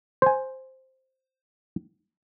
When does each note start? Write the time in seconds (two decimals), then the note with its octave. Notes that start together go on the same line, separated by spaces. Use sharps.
0.22 C5 G#5